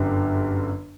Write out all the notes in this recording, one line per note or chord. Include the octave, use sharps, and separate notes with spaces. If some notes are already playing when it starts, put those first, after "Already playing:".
Already playing: G1 F#2 D3 G4